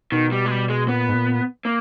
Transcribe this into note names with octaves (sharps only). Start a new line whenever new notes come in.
B2 D#3
G3
G#3
G3
G#3
A#2 B3
G#2
A#2
A#3